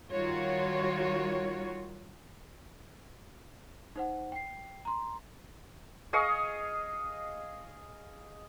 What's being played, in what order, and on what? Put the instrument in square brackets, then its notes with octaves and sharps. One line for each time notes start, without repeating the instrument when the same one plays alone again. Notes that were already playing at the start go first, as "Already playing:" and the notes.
[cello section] D#3 G3 F4 F#4 C#5
[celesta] D#4 C5 F#5
G5 C7
A#5 C6
[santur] G#4 D#5 F5 C#6